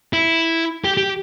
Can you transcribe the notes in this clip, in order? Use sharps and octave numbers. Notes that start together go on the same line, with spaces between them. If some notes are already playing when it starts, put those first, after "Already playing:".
E4
G4
G4